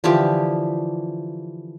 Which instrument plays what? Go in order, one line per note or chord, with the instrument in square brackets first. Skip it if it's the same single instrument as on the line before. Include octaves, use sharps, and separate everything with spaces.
[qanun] D3 E3 F3 G4